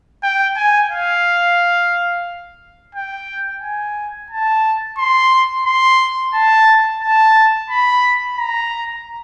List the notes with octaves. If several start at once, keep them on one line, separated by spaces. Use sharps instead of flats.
G5
G#5
F5
G5
G#5
A5
C6
C6
A5
A5
B5
A#5